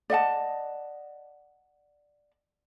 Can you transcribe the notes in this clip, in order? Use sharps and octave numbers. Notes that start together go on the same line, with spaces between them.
D5 D#5 F#5 A5